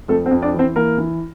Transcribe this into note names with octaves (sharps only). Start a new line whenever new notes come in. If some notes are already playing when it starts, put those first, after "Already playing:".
F2 A3 A4
C4 C5
F2
D4 D5
E3 C4 C5
E3 A#3 A#4
E3